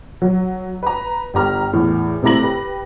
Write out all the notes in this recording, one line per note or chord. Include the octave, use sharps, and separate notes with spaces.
F#3
B4 A#5
G1 G4 A#5 F6
E2 A2
C3 A3 E4 A#5 A#6 F#7
G4 B4